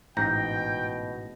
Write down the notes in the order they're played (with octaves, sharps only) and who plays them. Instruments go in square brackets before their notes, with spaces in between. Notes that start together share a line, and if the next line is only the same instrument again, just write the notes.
[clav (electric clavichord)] A1 G#2 A#5 [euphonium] B2 [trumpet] G5 [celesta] G6 A#6